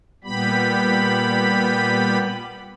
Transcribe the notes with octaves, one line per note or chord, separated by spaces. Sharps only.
A#2 G3 B3 G4 B5